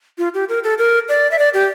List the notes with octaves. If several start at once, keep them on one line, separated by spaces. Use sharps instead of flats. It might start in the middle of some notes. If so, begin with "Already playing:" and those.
F4
G4
A#4
A4
A#4
D5
E5
D5
G4